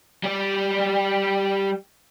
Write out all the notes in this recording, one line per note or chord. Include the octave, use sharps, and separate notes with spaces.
G3 D5